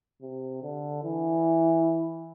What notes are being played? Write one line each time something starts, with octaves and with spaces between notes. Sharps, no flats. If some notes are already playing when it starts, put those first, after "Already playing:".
C3
D3
E3